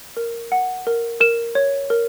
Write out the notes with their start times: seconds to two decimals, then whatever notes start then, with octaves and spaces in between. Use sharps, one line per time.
0.17 A#4
0.52 F#5
0.87 A#4
1.20 A#4 E7
1.55 C#5
1.90 A#4